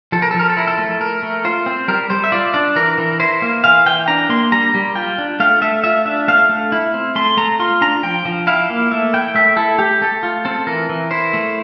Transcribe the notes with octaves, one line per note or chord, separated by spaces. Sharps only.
F3 A4
A#4
A4
F3
A#4
A4
E4 A#4
A4
A3
A3 A#4
A3
F4 C5
C4
G3 A#4
G3 C5
E5
F4 D5
D4 D5
E3 A#4
E3
E4 C5
A#3
E3 F5
E3 G5
D4 A#5
A#3 C6
G3 A#5
G3
F4 G5
D4
A3 F5
A3 E5
F4 E5
D4 E5
A3 F5
A3
E4
C4
A3 C6
A3 A#5
F4 C6
D4 A#5
F3 G5
F3
E4 F5
A#3
A3 E5
E4 G5
A3 E5
E4 A4
A3 G4
A3 A4
F4
C4 A4
E3 A#4
E3
E4 C5
A3